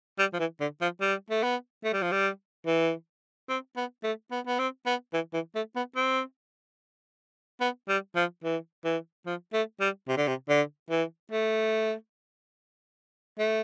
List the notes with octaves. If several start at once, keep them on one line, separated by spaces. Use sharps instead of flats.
G3
F3
E3
D3
F3
G3
A3
B3
A3
G3
F3
G3
E3
C4
B3
A3
B3
B3
C4
B3
E3
E3
A3
B3
C4
B3
G3
F3
E3
E3
F3
A3
G3
C3
D3
C3
D3
E3
A3
A3